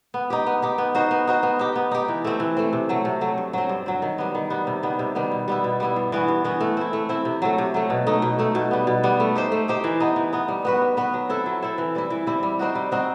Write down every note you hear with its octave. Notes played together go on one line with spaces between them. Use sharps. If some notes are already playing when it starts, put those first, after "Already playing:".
B3
D#4 G4
B3
D#4 G4
B3
D#4 F#4 C5
B3
D#4 F#4 C5
B3
D#4 G4
B3
D#4 G4
E3
A3 C4
E3
A3 C4
C3
F#3 A3
C3
F#3 A3
G2
F#3 C4
G2
F#3 C4
D#3
G3 B3
D#3
G3 B3
C3
D#3 G3 B3
C3
D#3 G3 B3
B2
G3 B3 E4
B2
G3 B3 E4
G2
E3 B3 F#4
G2
E3 B3 F#4
A3
C4 E4
A3
C4 E4
C3
F#3 A3
C3
F#3 A3
B2
A3 D#4
B2
A3 D#4
B2
G3 B3
B2
G3 B3
A3
D#4 G4 C5
A3
D#4 G4 C5
E3
B3 D#4
E3
B3 D#4
G3
B3 F#4 B4
G3
B3 F#4 B4
F#3
C4 E4 A4
F#3
C4 E4 A4
E3
G3 C4 E4
E3
G3 C4 E4
G3
C4 D#4 F#4
G3
C4 D#4 F#4